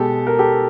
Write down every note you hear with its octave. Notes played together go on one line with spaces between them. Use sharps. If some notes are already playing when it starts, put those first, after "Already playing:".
Already playing: B2 G#3 G4 A4
A#4
G4 A4